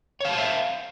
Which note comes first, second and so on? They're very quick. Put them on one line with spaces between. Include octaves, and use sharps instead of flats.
C#5 F5 A5 C5 E5